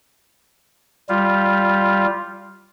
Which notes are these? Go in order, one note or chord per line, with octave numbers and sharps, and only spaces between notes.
G3 F4